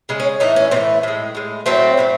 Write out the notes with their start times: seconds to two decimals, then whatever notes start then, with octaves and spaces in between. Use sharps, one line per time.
0.09 C#3 G#3
0.20 C#4
0.40 A2 E3 A3 D#4
0.56 C#4
0.71 A2 E3 A3 C4
1.03 A2 G#3
1.35 A2 G#3
1.66 A2 F#3 A3 C4
1.97 A2 F#3 A3